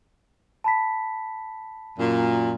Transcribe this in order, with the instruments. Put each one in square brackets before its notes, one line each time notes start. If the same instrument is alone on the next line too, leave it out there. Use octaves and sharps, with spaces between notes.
[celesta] A5 B5 B6
[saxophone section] F#2 A#2